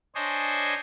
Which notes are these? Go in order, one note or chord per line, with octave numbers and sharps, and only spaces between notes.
D4 C5 C#5 D#5 G#5